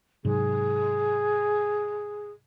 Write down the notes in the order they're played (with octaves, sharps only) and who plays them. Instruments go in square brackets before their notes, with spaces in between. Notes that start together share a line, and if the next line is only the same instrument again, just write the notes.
[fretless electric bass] G#2 C3 F#3 [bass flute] G#4